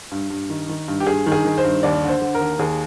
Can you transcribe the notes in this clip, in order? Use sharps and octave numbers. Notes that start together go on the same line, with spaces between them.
G2
G2
D#3
D#3
G2
G4
G2 G#4
D#3
G#4
D#3
C5
G2
D#2 D5
D3
C5
D3
A#4
D#2
D#2 G#4